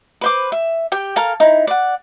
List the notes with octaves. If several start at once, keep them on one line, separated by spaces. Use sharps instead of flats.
B4 C5 D6
E5
G4 G5
A4 A#4 F5 G#5
D#4 E4
D5 F#5